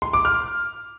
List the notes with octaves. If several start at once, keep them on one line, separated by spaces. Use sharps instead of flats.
C6
D6
F6